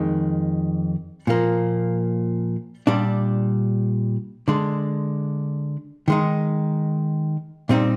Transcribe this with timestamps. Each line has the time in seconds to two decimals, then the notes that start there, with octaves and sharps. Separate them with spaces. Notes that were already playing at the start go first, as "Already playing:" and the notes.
Already playing: F2 D#3 G#3
1.27 A#2 F3 A#3
2.87 A#2 G3 D4
4.48 D3 G#3 D4
6.08 D#3 G#3 D#4
7.69 A#2 G3 C4 D#4